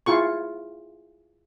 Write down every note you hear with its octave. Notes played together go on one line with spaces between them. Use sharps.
E4 F4 G#4 C#6